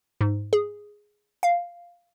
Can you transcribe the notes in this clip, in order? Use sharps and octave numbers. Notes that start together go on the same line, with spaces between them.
G#2
G#4
F5